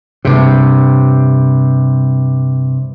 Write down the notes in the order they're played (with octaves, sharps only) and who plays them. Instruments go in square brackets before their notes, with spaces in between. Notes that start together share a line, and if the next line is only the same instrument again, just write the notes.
[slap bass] G2 C3